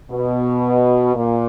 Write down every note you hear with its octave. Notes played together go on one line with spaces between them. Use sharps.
B2
A#2